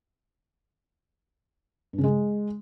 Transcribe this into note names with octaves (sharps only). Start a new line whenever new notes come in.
G2
C#3
G#3